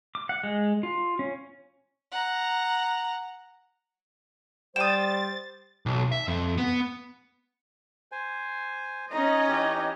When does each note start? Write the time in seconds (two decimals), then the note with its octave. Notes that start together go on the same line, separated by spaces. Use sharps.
0.15 D6
0.29 F#5
0.43 G#3
0.83 F4
1.19 C#4
2.12 F#5 A#5
4.76 G3 C5 G5 D#6 A6 E7
5.86 B1
6.12 E5
6.28 F2
6.58 B3
8.12 C5 G#5
9.12 C#4 D#4 D#5
9.48 E3 G4